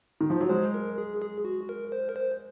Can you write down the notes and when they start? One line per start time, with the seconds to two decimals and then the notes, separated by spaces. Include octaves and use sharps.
0.21 D#3
0.30 F3
0.41 F#3
0.49 G#3 C5
0.74 A#4
0.98 G#4
1.22 G#4
1.45 F#4
1.69 A#4
1.92 C5
2.09 A#4
2.16 C5